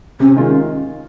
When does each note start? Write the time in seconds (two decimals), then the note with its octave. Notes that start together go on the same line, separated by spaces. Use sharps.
0.20 C3 C#4
0.36 D#3 G#3 C#4 F4